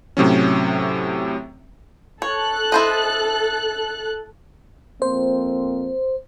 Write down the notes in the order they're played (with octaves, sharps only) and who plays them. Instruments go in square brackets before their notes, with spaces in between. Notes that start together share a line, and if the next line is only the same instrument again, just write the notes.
[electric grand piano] A2 C3 F#3 C#4
[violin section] A4 F#6 [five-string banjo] C#5
[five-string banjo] E4 C5 D#5
[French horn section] F2 A#3 C4 [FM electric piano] C5